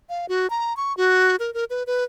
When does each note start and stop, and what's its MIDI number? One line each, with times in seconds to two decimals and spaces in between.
0.09 0.26 77
0.29 0.49 66
0.50 0.76 82
0.77 0.95 85
0.97 1.36 66
1.40 1.53 70
1.54 1.64 70
1.70 1.83 71
1.87 2.04 71